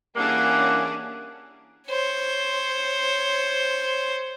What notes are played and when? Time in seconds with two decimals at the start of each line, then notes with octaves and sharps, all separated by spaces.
0.16 E3 G3 A#3 C#4 D4 G#4 F#5
1.89 C5 C#5